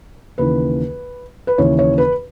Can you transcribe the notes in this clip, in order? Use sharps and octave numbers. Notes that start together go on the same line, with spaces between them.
D#2 C#3 E3 B4
B4
D#2 C#3 E3 C#5
C#5
B4